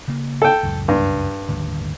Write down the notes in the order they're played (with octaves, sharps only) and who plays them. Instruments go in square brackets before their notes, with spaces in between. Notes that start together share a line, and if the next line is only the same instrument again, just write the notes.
[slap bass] C#3 A#3
[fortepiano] A4 G5
[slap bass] C#2 F#2 A2
[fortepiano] G2
[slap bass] G1 D#2 A2